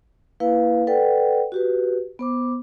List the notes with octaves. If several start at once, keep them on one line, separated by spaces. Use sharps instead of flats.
A#3 E4 B4 F5
A4 B4 D5 F#5 G5
F#4 G4 B4
B3 C5 D6